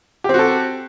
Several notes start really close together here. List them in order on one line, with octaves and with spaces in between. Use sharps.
G4 C4 F#4 A4